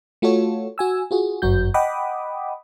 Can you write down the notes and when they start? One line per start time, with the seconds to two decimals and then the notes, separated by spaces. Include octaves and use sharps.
0.22 A3 F4 F#4 A4 C#5
0.78 F#4 G#5 E6
1.11 F4 F#4 G#4
1.42 G1 F#2 F#4 G6
1.74 D#5 F#5 G5 B5 D6 D#6